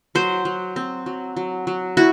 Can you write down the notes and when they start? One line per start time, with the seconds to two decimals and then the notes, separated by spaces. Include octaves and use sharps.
0.15 F#3 C5
0.45 F#3
0.76 C4
1.06 F#3
1.36 F#3
1.67 F#3
1.97 E4 F#4